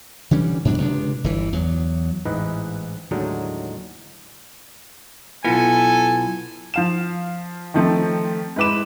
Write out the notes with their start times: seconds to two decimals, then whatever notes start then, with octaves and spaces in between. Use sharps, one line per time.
0.31 D3 E3 G3 C#4
0.65 G#2 B2 F#3 D4
0.78 C#2 C3 D4
1.24 G1 E3
1.53 E2 F#3
2.25 A1 G#2 E3 D#4 B4 D#5
3.11 D#2 A2 D3 F#3 G#3 D#4
5.45 B1 E2 B3 E4 F4 A4 G#5
6.74 F3 F5 E7
7.74 D#3 F3 A3 C4
8.56 G#2 E4 B4 D6 E7